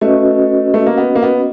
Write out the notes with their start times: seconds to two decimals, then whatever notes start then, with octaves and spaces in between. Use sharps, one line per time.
0.01 A3 C#4 F#4 B4 D#5
0.74 A3
0.86 A#3
0.97 B3
1.16 A#3
1.22 B3